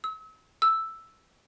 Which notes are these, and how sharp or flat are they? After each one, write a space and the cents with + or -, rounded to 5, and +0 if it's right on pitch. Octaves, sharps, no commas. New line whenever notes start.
E6 -40
E6 +0